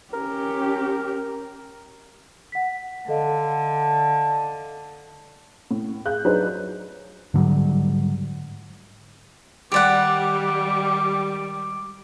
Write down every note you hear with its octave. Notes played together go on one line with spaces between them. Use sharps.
C#4 G4 A#4
F#5 B6
D3 A4 D#5 F5
A2
G#4 F5 F#6 G6
F#3 D4 D#4 G#4 B4 C5
G#2 D3 F#3 G3
D#3 G3 G#3 G4 D5 F#5 D6